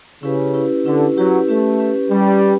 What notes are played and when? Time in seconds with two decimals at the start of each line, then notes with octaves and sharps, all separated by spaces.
0.23 C#3 C#4 E4 G4 B4
0.54 C#4 E4 G4 B4
0.85 D3 C#4 E4 G4 B4
1.16 F#3 C#4 E4 G4 B4
1.48 A3 C#4 G4 B4
1.80 C#4 G4 B4
2.11 G3 C#4 G4 B4
2.42 C#4 G4